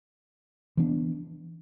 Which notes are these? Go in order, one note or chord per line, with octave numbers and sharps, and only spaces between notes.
E3 B3 D4